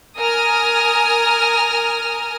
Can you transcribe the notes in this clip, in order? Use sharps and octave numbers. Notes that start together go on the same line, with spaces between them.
A#4 G#5 D#6 F6